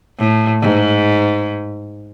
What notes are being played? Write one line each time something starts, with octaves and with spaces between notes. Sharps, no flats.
A2
G#2